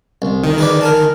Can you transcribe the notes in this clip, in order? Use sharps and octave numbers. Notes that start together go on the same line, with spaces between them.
C2
D#3
G#4 B4 D5
A#4 G#5 A5